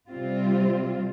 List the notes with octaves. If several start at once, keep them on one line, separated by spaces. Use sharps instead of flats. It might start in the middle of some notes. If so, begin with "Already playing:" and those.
C3 G3 C4 F4